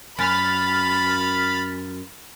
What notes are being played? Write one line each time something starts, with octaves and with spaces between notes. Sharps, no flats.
F#2 B5 F6 A6 B6